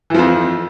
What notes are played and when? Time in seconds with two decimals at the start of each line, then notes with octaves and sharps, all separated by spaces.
0.10 E3
0.14 F3
0.19 F2